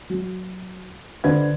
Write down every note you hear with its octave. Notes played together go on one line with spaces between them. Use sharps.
F#3
D3 B4 C5 G#6